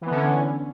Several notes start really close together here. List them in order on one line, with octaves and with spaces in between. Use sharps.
E3 B3 D3 C#4